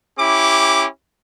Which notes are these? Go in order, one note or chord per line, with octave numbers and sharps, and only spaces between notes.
C#4 E4 G4 D6